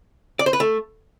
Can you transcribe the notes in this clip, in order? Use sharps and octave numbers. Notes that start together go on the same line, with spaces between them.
D5
C5
B4
A3